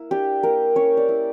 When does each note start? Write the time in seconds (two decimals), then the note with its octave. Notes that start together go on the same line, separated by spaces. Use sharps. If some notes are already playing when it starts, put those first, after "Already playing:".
Already playing: A#3 E4
0.11 D4 G4
0.43 A#3 A#4
0.76 C#4 C#5
0.97 D5
1.09 E4